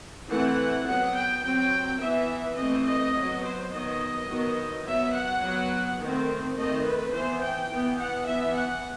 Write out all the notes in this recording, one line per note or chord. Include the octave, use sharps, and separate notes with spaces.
E3 A3 C4 F#5
F#3 B3 F#5
G5
F#3 C4 G5
E3 B3 E5
E3 A3 C4 D#5
D#5
F#3 B3
C5
D#3 F#3 B3 D#5
D#3 F#3 B3
F#3 B3 E5
F#5
F#3 B3
D#3 A3 C4
D#3 A3 C4 D#5
B4
E3 B3 C5
G5
E3 B3
F#5
E3 B3 E5
F#5